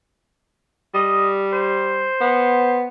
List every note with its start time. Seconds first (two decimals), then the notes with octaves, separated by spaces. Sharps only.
0.94 G3 D#5
1.53 C5
2.20 B3